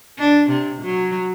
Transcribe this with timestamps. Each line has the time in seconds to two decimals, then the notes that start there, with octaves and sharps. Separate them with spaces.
0.19 D4
0.50 C3
0.82 F#3